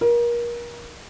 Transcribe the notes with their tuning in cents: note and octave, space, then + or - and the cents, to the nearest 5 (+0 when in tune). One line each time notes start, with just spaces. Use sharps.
A#4 +30